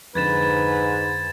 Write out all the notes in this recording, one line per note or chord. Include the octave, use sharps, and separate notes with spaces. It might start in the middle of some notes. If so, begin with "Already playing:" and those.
F2 G#2 D3 B4 G#6 A6 E7